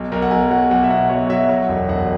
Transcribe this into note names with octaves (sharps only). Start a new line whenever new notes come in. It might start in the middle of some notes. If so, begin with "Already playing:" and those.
Already playing: B1
B1 A#4
F#5
B1 G#5
F#3 F#5
B1 F#5
E5
B2 F#5
B1 C#5
F#3 E5
F#3
E1
E1 F#5